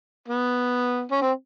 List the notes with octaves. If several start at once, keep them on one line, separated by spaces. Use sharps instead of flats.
B3
C#4
C4